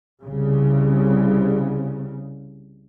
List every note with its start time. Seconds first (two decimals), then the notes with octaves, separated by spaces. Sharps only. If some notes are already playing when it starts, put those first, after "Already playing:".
0.23 C2 C#3